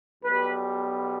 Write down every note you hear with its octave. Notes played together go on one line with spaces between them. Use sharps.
B1 B2 G3 B4